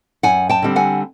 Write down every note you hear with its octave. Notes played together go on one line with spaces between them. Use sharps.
F#2 F#5 G#5
G5 A5
D3 G3 C4
F#5 G#5